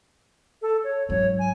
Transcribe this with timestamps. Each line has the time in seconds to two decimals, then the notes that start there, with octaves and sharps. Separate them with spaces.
0.62 A4
0.84 C#5
1.09 G#2 F#3 C#5
1.39 G#5